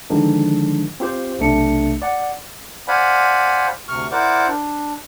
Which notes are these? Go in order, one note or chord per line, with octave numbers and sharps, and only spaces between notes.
D3 D#3 F3 G#3 D4
C4 F4 G4 C5
B1 C3 A3 D4 C#7
D5 F#5
C5 D5 F5 F#5 G#5 B5
D2 C3 C#6 F6
E4 A#4 C5 D5 F#5 D6
D4